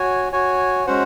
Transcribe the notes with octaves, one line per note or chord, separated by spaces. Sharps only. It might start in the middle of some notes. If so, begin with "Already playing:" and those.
Already playing: F#4 C#5 G#5
F#4 C#5 G#5
G#3 C#4 F#4 C5 F#5